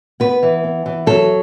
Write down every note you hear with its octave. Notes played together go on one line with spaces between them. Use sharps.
B3 B4
E3
B3
E3
F#3 A4